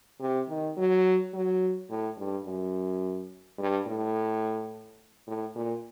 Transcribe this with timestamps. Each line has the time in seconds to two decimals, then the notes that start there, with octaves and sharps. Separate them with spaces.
0.21 C3
0.49 D#3
0.77 F#3
1.34 F#3
1.90 A2
2.18 G2
2.46 F#2
3.59 G2
3.87 A2
5.27 A2
5.55 A#2